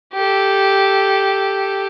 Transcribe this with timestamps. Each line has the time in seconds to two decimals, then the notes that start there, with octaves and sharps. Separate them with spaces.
0.14 G4 A4